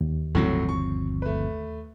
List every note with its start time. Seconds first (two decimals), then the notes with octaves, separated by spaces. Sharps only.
0.01 D#2
0.35 G1 A2 F3 F#3 C4
0.69 C#6
1.22 A3 B4